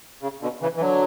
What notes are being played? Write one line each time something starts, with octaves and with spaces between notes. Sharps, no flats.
C#3
B2 D3
C#3 E3
E3
D3 F#3